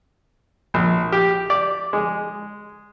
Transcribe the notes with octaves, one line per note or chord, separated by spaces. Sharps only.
A#1
G4
D5
G#3